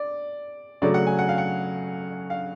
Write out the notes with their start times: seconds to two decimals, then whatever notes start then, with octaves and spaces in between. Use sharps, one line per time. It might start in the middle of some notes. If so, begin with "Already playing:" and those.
Already playing: D5
0.82 C#3 F#3 A3 D5
0.94 F#5
1.07 G#5
1.19 F#5
1.29 F5
1.38 F#5
2.30 F5